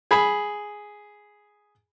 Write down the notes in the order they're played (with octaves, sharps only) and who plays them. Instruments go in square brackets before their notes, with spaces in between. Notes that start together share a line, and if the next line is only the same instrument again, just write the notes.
[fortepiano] G#4 B5